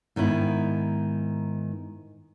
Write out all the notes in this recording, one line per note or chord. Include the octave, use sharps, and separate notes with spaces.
G#2 D#3 B3 E4